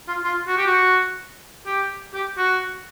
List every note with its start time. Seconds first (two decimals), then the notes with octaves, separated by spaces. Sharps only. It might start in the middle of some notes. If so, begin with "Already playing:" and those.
0.08 F4
0.24 F4
0.47 F#4
0.58 G4
0.66 F#4
1.67 G4
2.14 G4
2.38 F#4